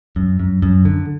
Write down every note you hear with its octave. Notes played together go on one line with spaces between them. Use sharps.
F#2
F#2
F#2
D3